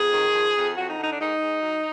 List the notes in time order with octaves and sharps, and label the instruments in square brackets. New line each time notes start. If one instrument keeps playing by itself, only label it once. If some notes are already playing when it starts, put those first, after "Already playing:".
Already playing: [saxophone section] F2 G#4
D#3
F3
F2
F2 F#4
D#4
D3
D#4
D4
G#2 D#4
G#2
F#3